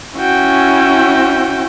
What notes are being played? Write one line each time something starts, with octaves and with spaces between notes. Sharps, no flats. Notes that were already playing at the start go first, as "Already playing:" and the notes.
C#4 E4 F#4 G5